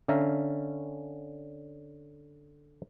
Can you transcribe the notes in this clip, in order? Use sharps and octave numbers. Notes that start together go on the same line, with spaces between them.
D3 C#4 E5 F5 A#5